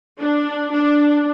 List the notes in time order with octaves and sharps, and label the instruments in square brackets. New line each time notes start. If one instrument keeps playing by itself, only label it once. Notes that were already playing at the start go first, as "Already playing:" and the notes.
[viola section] D4
D4